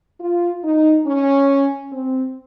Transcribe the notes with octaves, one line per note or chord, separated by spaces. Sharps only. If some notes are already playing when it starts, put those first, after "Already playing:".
F4
D#4
C#4
C4